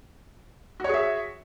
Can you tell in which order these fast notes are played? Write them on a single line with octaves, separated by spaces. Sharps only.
F#4 C#5 G#4 E5